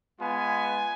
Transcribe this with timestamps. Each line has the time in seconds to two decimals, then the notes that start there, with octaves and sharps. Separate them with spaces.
0.19 G#3 B3 F4 G#5